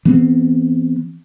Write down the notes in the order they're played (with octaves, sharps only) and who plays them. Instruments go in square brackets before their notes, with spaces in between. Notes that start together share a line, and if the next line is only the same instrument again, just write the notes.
[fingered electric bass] E3 B3 C4